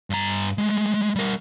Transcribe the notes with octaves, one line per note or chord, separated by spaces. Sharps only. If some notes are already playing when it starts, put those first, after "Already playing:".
G2 A#5
G#3 A3
G3 A#4